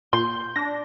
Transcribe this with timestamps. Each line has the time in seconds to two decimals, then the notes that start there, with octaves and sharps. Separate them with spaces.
0.13 A#2 C6 G6
0.56 D4 A#6